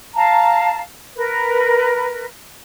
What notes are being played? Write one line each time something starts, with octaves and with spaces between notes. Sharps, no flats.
F5 A5 A#5
A#4 B4